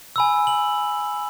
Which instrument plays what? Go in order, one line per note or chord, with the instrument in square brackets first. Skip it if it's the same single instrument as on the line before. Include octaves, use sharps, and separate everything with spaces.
[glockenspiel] G#5 B5 E6
F#7